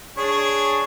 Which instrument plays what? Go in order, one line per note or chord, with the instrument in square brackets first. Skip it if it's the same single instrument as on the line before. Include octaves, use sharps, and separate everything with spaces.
[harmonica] D4 G#4 C#5